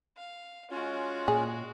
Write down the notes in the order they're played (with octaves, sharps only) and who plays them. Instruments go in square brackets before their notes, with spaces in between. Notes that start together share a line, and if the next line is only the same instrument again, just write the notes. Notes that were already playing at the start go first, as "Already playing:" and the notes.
[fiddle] F5
[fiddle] G#3 F#4 [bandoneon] C#4 F4 C#5
[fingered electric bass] A#2 [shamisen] G#4